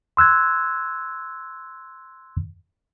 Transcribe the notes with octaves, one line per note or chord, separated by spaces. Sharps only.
C6 E6 F#6 G#6